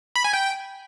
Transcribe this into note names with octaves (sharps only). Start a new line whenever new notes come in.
B5
G#5
G5